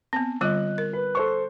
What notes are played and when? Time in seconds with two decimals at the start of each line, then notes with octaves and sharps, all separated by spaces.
0.13 B3 C4
0.41 D3 G3 F4 D#5 F#6
0.78 A#4
0.93 B4
1.15 A4 C5 C#6